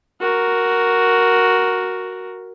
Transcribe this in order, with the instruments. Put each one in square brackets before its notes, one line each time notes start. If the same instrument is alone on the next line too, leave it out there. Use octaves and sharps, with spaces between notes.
[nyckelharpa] F#4 A#4